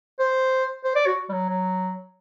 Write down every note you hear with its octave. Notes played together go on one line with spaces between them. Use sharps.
C5
C5
D5
F#4
G3
F#3
F#3